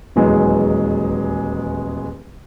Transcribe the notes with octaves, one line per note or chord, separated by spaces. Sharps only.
D#1 E2 F#3 G#3 B3 G#4